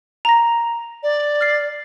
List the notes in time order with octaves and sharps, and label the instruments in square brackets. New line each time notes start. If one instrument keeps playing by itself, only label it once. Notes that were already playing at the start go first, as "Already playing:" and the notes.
[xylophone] A#5 A#6
[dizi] D5
[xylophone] F6 A6 C7